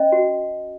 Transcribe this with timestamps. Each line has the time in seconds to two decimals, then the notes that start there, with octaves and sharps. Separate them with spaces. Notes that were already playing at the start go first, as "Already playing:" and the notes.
Already playing: C#4 D#5
0.12 F#4